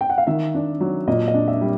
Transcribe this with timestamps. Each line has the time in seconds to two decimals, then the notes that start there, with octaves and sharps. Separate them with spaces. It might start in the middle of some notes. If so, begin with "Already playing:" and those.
0.01 G5
0.10 F#5
0.18 F5
0.27 D#3 E5
0.55 D4
0.81 F#3
1.08 A#2 D#5
1.28 D#5
1.34 D4
1.48 E5
1.61 G3